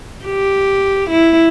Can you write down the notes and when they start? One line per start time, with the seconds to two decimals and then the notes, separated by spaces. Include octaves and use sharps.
0.25 G4
1.10 E4